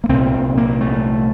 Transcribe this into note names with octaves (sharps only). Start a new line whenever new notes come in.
A#3
C2 A#2 C4
A#3
A3